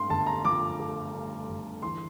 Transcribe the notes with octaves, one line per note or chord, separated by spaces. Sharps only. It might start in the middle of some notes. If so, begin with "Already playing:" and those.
Already playing: G2 A3 C6
G1 A5
A#5
F3 D6
A3
G2
G1
E3 C6